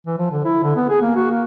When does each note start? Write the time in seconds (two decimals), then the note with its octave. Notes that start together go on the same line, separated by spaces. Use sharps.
0.06 E3
0.18 F3
0.32 D3
0.45 E4
0.63 D3
0.76 B3
0.90 G#4
1.02 A#3
1.16 F#4
1.31 A#3